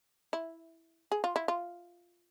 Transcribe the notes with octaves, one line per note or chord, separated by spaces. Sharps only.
E4
G#4
F4
E4
F4